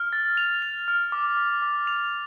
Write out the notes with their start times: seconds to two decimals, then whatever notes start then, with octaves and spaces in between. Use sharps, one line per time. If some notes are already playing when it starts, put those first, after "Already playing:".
Already playing: F6
0.13 A6
0.37 F7
0.62 F7
0.88 F6
1.12 D6
1.37 D6
1.62 D6
1.87 F7